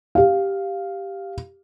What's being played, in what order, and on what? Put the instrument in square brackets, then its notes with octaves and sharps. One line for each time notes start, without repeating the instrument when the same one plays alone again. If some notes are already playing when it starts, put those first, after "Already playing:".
[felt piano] G4 F5